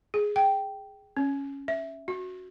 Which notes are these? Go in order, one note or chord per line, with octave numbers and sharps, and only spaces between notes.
G#4
G5
C#4
E5
F#4